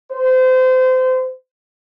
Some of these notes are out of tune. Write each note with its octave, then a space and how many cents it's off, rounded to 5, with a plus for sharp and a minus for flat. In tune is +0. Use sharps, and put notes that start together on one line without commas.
C5 -30